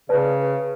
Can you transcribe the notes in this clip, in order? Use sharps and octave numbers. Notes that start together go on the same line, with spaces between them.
C#3 B4 D5 A5